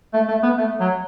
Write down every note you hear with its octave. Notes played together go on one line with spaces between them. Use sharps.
A3
A3
B3
A3
F#3